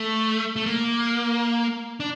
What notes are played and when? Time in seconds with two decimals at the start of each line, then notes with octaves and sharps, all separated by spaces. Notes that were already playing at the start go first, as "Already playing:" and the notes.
Already playing: A3
0.56 A3
0.66 A#3
2.00 D4